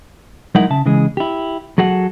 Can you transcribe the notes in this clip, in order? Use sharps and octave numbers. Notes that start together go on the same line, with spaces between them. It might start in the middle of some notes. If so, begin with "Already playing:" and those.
F#3 G#3 D#4 E4 A#4 F#5
C#3 E5 A5
C#3 E3 G#3 G#4
E4 G4
F#3 F#4 G#4 A4 F#5